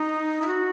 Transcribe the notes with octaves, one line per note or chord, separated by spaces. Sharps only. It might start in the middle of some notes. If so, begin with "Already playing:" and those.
Already playing: D#4
E4
F#4